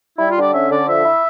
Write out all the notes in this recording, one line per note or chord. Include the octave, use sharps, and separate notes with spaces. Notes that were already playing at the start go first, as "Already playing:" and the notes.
G3 E4
F4
D3 D5
C#4 E5
D3 D5
F3 E5
E4